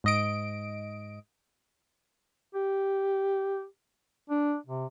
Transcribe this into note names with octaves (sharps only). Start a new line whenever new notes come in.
G#2 D#5 D7
G4
D4
C3